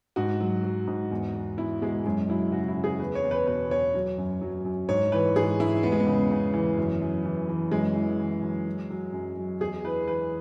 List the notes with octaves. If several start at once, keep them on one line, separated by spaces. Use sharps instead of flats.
G#2 F#4
F#3
F#3
G#2
E2
E2
E2 E4
B2 G#3
F#2 G#3
F#3 E4
C#3 F#4
E4
C#3
G#4
E2 B4
C#5
E2
B4
B2 B4
E2 C#5
F#3
F#2
F#3
F#2
G#2 C#5
E3 B4
G#2 G#4
G#2 E4
E2 B3
G#3
B3
C#3
C#3
E3
F#2
F#2
E3
E3
F#2 G#3
E3
E3
F#2
F#3
F#3
F#2
F#3
E2 G#4
E3 B4
E3 B4